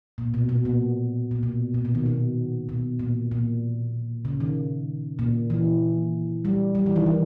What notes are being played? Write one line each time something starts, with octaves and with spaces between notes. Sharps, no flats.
A#2
B2
B2
A#2
A#2
B2
A#2
B2
D#3
B2
B2
A#2
A#2
C#3
D#3
A#2
E3
G3
G3
E3
D#3
E3